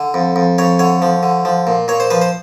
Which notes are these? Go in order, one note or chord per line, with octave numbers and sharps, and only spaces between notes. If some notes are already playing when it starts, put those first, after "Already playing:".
Already playing: D3
F2
F2
F2 C#5
D3 C#5
F3
D3
F3
A#2
A#2 C#5
C5
F3 B4
C5